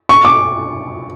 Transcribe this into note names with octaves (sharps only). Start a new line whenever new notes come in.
C#6
D6